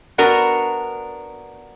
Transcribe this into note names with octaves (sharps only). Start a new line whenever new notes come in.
B3 D4 F#4 A#4